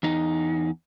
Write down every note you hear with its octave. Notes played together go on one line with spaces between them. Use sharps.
E2 D#4